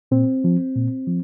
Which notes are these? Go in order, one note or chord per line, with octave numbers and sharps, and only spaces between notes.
A#2 C4
F3
A#2
F3